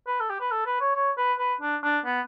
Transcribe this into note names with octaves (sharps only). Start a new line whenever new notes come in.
B4
A4
G4
B4
A4
B4
C#5
C#5
B4
B4
D4
D4
B3